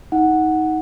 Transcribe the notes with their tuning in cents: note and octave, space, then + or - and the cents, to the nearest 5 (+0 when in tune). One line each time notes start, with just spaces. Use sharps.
D#4 +20 F#5 +0